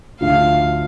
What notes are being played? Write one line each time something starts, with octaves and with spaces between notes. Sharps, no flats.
D2 D3 F3 F5